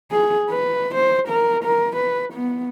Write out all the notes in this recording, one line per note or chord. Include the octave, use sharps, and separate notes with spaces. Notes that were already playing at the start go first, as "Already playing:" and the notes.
G#4
B4
C5
A#4
A#4
B4
B3